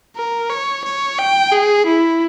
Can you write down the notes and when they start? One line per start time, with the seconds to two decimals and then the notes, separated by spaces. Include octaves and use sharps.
0.16 A#4
0.50 C#5
0.85 C#5
1.19 G5
1.52 G#4
1.86 E4